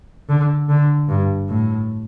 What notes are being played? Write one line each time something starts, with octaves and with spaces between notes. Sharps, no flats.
D3
D3
G2
A2